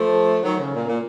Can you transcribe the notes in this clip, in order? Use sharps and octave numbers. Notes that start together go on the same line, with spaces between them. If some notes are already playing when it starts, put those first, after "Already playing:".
Already playing: F3 A3
D#3 F#3
C#3
A#2
A#2